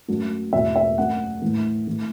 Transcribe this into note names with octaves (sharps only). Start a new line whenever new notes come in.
F#2 F#3 A3
E2 B2 A3 E5
E5
F#2 F#3 A3 F#5
A2 E3 A3
E3 A3